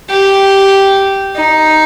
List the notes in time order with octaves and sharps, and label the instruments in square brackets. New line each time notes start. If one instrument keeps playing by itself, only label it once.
[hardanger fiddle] G4
D#4